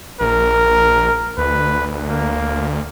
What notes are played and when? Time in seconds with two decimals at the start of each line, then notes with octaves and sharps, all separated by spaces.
0.21 A#1 A#4
1.38 D2 B4
2.09 A#3